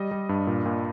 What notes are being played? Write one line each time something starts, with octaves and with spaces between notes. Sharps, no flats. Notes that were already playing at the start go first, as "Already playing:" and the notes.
Already playing: G3 D#5
G3
G2
A#2
A#2